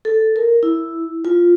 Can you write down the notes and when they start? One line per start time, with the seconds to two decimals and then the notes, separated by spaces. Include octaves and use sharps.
0.05 A4
0.36 A#4
0.63 E4
1.25 F4